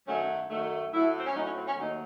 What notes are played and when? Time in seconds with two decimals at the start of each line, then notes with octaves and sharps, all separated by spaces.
0.07 F#2 D#3 F#3 A3 C#4
0.50 F#2 D#3 F#3 A3
0.93 A2 F#3 A3 E4
1.18 C4
1.26 C#4
1.35 A2 F#3 A3 D#4
1.46 C#4
1.56 C4
1.67 C#4
1.78 D#2 D#3 F#3 A3 D#4